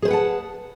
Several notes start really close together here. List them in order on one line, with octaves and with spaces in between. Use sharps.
G#4 C5 B4 F#5 A5